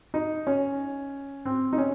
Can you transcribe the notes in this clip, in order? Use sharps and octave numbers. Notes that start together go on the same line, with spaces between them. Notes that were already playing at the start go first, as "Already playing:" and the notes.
D#4
C#4
C4
D#4
C#4